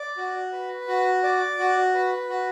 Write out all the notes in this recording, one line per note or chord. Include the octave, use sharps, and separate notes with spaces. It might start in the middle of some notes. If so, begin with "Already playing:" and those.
Already playing: D5
F#4
B4
F#4
D5
F#4
B4
F#4